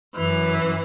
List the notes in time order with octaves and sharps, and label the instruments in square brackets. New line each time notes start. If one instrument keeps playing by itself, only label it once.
[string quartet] F#2 E3